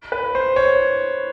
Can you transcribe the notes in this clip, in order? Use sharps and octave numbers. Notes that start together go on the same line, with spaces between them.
B4
C5
C#5